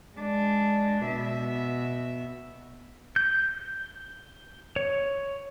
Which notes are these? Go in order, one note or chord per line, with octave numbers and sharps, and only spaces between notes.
G#3 D4
B2 E5
G6
C#5